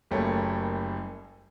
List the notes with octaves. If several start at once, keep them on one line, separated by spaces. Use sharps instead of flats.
F#1 G3 A3 A#3 C#5